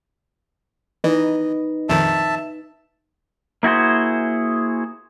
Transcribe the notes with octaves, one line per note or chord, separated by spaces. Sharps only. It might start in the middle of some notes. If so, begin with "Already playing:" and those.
E3 D#4 B4 D#5
A#1 F2 D#3 E5 A5
A#3 E4 F#4 G#4 C5